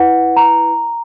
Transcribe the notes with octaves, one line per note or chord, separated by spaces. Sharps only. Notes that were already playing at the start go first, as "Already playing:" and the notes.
Already playing: E4 B4 F#5
A#5